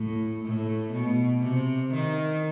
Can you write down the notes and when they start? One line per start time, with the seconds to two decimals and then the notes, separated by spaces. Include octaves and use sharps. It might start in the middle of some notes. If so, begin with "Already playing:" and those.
Already playing: A2
0.45 A2
0.93 B2
1.43 C3
1.93 D#3